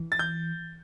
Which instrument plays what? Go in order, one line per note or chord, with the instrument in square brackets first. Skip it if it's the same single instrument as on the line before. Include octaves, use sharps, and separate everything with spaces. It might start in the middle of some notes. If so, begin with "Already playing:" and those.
Already playing: [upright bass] E3
[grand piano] A6
G6